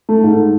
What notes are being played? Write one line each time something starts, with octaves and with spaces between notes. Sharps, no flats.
A3
G#2